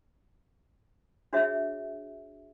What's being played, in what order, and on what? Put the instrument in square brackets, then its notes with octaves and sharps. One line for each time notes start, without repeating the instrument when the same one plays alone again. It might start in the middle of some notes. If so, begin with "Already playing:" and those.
[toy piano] D4 F#4 G#4 C#5 E5